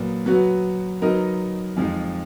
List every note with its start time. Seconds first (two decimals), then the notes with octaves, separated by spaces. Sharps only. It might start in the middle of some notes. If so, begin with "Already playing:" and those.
Already playing: A#2 F#3 B3
0.26 F#3 B3 F#4
1.01 F#3 B3 D#4 A#4 D#5
1.77 F2 F3 G#3 D#4